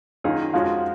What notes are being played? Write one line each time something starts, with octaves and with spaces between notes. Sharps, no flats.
F#2 D#3 A#3 D#4 F4 G#4
F2 F3 G#3 C#4 F4 F#4